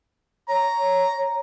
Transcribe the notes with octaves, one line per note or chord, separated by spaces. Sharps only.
C#5 A#5